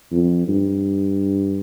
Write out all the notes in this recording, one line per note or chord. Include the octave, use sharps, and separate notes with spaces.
F2
G2